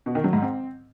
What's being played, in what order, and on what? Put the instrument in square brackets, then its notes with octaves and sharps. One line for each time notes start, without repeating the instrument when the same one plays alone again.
[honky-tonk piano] B2
D#3
F#3
G#2
C4